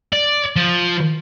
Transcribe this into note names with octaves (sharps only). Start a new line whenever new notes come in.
D5
F3